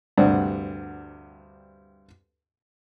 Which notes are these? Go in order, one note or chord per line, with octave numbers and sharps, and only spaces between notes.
D2 G2 C3 C4 D5 F#5